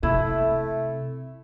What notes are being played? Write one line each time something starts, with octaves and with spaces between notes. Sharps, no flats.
C3 A3 E4